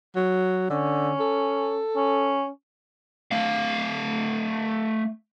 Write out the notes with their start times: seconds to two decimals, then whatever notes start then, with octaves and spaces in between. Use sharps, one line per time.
0.16 F#3
0.70 D3 C#4
1.20 A4
1.96 C#4
3.31 A3 F5